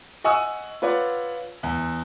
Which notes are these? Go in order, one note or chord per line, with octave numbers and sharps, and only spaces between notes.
D#5 F#5 G#5 C#6 D#6 E6
F4 B4 C#5 D5 F#5
E2